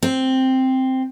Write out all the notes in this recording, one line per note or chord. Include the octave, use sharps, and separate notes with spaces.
C4